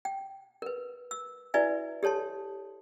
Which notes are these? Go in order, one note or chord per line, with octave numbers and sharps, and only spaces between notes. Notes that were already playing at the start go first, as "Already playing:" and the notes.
G5
A#4 B4
E6
E4 F#4 B4 D5 E5 G#5
G4 A4 C#5 A5 C6